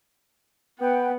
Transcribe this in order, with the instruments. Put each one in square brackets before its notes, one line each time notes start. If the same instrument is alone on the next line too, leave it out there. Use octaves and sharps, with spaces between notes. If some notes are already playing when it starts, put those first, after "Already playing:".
[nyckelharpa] B3 [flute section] B4 F#5 G5